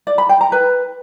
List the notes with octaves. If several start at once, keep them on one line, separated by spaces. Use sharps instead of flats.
D5
B5
G5
A#5
B4